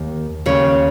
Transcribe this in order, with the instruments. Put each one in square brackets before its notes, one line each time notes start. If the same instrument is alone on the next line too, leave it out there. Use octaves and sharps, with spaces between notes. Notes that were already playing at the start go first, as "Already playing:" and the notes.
Already playing: [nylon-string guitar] D#2
D#2 C#3 C#5